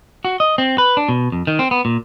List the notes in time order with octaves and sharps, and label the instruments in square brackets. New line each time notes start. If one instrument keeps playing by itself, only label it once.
[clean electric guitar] F#4
D#5
C4
B4
D4
B2
F2
D#3
C4
B3
A#2